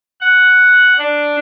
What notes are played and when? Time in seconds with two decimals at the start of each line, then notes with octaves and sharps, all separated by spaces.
0.21 F#5
0.99 D4